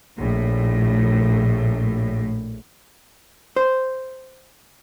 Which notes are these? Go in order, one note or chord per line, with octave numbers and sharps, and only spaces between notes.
A#1 A2
C5